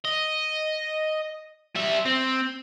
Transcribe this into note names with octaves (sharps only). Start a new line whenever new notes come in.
D#5
G3 E5
C4